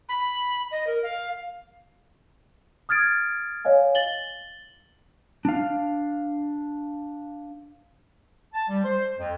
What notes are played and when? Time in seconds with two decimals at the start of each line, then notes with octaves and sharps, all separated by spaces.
0.09 B5
0.71 D#5
0.87 A#4
1.03 F5
2.89 D#6 F6 G#6 A6 D7
3.65 C#5 D#5 F5 G#5
3.95 A6 F#7 G7
5.45 D4 F5
8.54 A5
8.69 G3
8.84 C5
9.18 F2